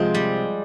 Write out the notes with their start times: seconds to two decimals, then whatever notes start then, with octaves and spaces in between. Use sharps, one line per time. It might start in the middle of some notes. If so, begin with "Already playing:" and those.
Already playing: C3 F3 G#3 C4
0.15 G3